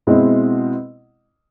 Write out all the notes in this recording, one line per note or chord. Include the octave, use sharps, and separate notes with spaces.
B2 G#3 C4 E4